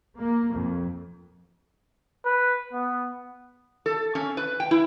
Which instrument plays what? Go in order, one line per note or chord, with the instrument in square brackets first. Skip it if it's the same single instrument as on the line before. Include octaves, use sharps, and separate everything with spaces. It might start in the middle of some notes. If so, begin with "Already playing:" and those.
[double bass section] A#3
F2
[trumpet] B4
B3
[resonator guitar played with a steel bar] A4
C#4
B4
G5
E4